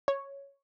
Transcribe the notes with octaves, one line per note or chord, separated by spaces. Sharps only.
C#5